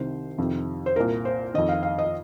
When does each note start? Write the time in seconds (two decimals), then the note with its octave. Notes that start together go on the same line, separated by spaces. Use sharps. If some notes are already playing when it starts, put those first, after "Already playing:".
Already playing: C2 C3 D#3 C5
0.38 F2 C3 D#3
0.86 C5
0.96 C2 A#2 A#4
1.25 C5
1.54 F2 D#3 D#5
1.69 F5
1.83 F5
1.98 D#5